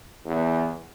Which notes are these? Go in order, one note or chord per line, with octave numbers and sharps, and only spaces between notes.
E2